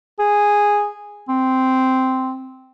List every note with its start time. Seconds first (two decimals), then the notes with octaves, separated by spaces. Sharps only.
0.19 G#4
1.28 C4